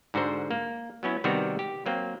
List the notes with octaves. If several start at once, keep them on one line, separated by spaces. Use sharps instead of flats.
G#2 D3 F#4 A#4 C5
A#3
F#3 B3 C#4 E4
C3 D#3 G3 B3 C4 F#4
G4
F#3 A#3 C4